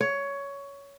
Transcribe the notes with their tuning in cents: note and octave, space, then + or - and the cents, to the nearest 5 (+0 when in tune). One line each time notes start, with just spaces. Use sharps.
C#5 +15